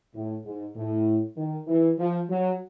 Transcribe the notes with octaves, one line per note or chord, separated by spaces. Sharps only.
A2
G#2
A2
D#3
E3
F3
F#3